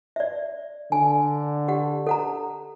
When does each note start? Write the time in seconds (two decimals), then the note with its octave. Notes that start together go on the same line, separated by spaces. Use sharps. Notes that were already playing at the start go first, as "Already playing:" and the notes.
0.16 D5 E5
0.92 D3 G#5
1.68 G4 F#5
2.07 A4 F#5 A#5